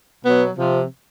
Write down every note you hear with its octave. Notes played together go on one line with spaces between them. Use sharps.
B2 F#3 B3
C3 F3